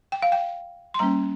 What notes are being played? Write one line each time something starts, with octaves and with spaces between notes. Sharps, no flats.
G5
F5
G5
C6
G3 A#3 C#4 A#5